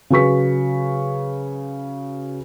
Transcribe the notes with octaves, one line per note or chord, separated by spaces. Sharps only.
C#3 F#3 B4 C#6 B6